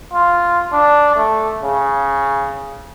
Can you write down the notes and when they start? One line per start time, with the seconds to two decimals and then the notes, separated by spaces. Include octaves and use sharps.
0.13 F4
0.73 D4
1.16 A3
1.63 C#3